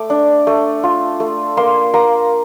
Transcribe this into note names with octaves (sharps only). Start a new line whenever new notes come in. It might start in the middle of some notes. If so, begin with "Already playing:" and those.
Already playing: A3 D6
D4
A3
F4
A3
A#3 C6
A#3 A#5